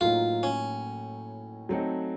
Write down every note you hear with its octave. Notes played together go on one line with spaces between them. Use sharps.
A2 F#3 A#3 D#4 F4
C#4
F#3 A3 C4 D#4 A4